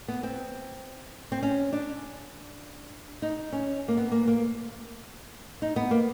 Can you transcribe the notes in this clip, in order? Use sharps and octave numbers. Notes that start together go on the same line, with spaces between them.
B3
C4
C4
C#4
D4
D#4
C#4
A#3
B3
A#3
A#3
D#4
B3
A#3